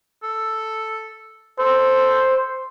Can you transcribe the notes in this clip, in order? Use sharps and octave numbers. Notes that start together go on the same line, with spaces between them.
A4
A4 C5